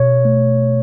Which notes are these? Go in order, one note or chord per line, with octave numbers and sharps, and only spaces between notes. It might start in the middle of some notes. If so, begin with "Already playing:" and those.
Already playing: B2 C#5
A3